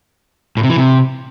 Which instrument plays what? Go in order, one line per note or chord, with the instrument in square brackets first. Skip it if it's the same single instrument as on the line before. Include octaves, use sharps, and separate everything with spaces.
[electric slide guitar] A2
C3
E3
C3